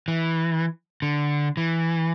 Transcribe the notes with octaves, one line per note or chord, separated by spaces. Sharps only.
E3
D3
E3